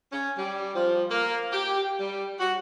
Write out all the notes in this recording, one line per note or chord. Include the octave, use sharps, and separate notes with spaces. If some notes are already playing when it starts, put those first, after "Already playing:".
C#4
G3
F3
A#3
G4
G3
F#4